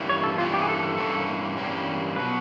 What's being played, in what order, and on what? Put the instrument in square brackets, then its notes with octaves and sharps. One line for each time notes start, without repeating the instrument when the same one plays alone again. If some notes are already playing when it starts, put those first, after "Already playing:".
Already playing: [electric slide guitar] G2 E3 G3 A#3 C#4
[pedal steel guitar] C#5
A4
[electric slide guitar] G2 E3 G3 A#3 C#4 [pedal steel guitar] F4
[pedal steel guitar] G4
G#4
A4
A4
[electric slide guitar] G2 E3 G3 A#3 C#4
G2 E3 G3 A#3 C#4
[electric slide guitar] B2 F#3 [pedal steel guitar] B4